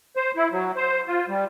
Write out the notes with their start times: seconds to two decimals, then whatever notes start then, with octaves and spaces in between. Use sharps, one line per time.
0.16 C5
0.36 E4
0.52 F#3
0.76 C5
1.08 F4
1.29 G3